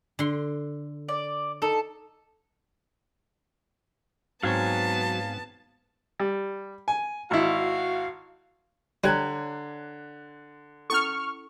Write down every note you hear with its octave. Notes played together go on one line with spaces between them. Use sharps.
D3 C6
D5
D#4 A4
G#2 F#3 B3 C4 C#5 F5 G#5 A5
G3
G#5
G#1 E4 F#4 F5
D3 G3 C#5 D5 A#5 F#6 G#6
C#4 E4 A4 C#6 F6